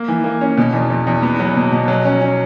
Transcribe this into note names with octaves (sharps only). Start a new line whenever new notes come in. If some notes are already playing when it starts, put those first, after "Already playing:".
Already playing: A#3
E3
A#3
C#4
B2
E2
E2
E2
B3
F#3
B2
B2
F#3
C#4
C#4